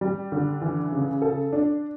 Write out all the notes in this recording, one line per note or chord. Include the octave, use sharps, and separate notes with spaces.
G3
D3
E3
C#3
A4
D4